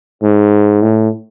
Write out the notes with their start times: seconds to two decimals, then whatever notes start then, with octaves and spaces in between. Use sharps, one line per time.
0.23 G#2
0.82 A2